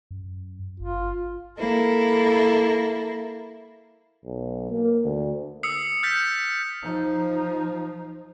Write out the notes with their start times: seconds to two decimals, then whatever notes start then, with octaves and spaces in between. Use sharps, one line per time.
0.11 F#2
0.80 G1 F4
1.59 A#3 E4 A4
4.25 B1
4.71 A#3
5.04 D2
5.63 D#6 E6 C7 C#7
6.03 F6 G6 A6 B6
6.83 F3 D#4